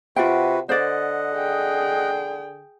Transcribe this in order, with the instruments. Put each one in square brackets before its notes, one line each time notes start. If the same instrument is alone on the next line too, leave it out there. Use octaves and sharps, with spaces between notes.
[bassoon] C3 [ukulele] F4 F#5 G5 [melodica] F#4 B4
[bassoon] D3 [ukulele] C5 D5 [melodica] D#5 F#5
[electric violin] G#4 G5